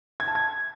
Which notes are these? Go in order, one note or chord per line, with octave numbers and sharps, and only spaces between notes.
G#6
A5
G#6